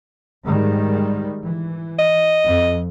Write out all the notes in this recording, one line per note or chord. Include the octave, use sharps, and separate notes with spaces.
G#2 D#3 G3
E3
D#5
F2